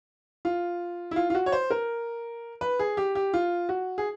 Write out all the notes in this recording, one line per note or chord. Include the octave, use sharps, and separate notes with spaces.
F4
E4
F4
F4
F#4
C#5
C5
A#4
B4
G#4
G4
G4
F4
F#4
G#4